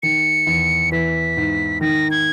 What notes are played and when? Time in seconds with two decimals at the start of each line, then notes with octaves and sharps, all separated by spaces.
0.03 D#3 C#7
0.47 E2
0.92 E3 B6
1.37 G#2
1.81 D#3 A#6
2.11 G#6